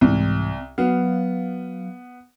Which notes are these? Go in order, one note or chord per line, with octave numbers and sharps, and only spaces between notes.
C2 G#2 E3
F#3 B3 F5